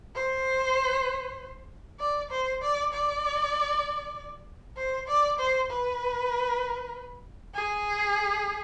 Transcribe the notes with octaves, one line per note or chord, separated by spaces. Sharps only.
C5
D5
C5
D5
D5
C5
D5
C5
B4
G#4